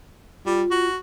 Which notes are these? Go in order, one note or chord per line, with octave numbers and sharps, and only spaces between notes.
G3 F4
F#4